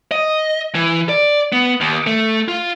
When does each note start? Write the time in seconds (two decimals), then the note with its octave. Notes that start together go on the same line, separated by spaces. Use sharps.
0.11 D#5
0.75 E3
1.09 D5
1.53 B3
1.81 D#2
2.07 A3
2.48 F4